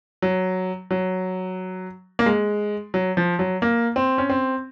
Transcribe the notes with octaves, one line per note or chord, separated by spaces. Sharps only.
F#3
F#3
A#3
G#3
F#3
F3
F#3
A#3
C4
C#4
C4